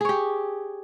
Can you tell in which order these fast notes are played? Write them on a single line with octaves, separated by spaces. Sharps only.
G#4 C#5 G4